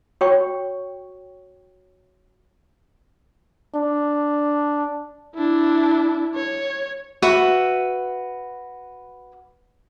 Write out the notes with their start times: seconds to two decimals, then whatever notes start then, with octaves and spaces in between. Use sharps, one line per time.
0.21 F#4 C#5 G5 C#6
3.75 D4
5.35 D4 E4
6.35 C#5
7.22 F#4 B4 E5